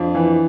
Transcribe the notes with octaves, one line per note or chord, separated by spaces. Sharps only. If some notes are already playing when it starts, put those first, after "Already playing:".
Already playing: F2 D4
E3